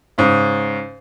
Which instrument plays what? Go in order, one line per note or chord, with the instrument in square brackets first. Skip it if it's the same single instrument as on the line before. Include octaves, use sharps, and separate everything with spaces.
[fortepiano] G#2 C#3